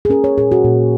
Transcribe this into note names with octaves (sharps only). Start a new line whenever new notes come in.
G#4
C#4 A#4
C#5
A#2 G#4
F#4
A#2